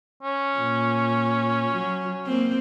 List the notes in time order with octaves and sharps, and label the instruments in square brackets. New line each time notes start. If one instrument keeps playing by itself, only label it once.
[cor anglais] C#4
[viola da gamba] A#2
F#3
A#3 C4